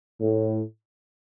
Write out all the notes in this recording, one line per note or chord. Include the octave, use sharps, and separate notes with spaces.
A2